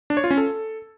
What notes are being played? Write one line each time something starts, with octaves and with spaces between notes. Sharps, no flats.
D4
C#5
F4
C#4
A4